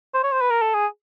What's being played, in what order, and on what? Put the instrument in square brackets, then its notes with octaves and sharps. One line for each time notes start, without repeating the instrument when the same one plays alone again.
[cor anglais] C5
C#5
C5
B4
A#4
A4
G#4